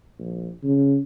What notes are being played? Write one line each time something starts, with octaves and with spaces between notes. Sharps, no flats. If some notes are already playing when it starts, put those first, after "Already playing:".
A#1
C#3